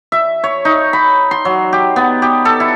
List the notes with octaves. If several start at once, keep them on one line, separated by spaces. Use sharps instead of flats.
E5
C#5
D#4
B5
C6
F#3
G4
B3
G4
A4
E4